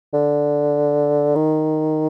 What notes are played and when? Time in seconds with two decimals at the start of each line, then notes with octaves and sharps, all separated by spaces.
0.13 D3
1.36 D#3